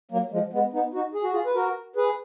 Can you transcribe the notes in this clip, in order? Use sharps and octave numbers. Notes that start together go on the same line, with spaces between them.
F#3 A#3
F3 G#3
G#3 B3
B3 D#4
D#4 F#4
G#4
F#4
F4 G#4
B4
F#4 A#4
G#4 B4